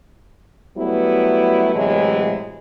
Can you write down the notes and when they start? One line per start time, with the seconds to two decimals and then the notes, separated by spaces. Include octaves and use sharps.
0.78 F#3 G3 A3 B3 E4
1.75 A2 C3 E3 F#3 G#3